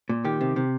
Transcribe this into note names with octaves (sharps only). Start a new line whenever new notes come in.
A#2
D#3 G4
C3
C3